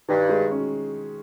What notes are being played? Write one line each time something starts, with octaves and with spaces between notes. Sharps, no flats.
G2 D#3
G#3
C#4